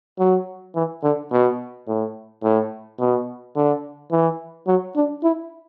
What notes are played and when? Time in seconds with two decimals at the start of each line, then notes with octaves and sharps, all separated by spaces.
0.19 F#3
0.75 E3
1.03 D3
1.31 B2
1.88 A2
2.43 A2
3.00 B2
3.56 D3
4.11 E3
4.67 F#3
4.96 D4
5.23 E4